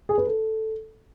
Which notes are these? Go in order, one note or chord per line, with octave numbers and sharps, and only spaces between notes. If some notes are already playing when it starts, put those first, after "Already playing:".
G#4
B4
A4